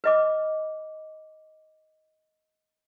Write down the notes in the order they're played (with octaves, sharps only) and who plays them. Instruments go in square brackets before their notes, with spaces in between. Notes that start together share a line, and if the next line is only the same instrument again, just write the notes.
[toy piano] B4 D#5 D6